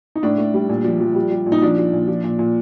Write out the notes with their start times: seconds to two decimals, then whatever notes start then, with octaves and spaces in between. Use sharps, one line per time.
0.15 D#4
0.23 A2 D4
0.38 A2
0.54 G3
0.69 A#2
0.84 F3
1.00 F3
1.15 G3
1.31 G3
1.46 A#2
1.52 D#4
1.62 F3 D4
1.78 F3
1.93 A#2
2.08 F3
2.24 A#2
2.39 A#2